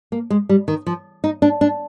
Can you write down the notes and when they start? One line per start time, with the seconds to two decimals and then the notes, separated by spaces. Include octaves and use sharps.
0.12 A#3
0.30 G#3
0.49 G3
0.68 D#3
0.87 F3
1.24 D#4
1.42 D4
1.61 D4